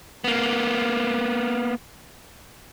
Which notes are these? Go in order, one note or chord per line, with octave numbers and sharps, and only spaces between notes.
A#3 B3